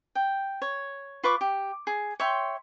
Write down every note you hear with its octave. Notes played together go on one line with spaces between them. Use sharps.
G5
C#5
F4 B4 C#6 D6
G4
G#4
C#5 E5 G5 C6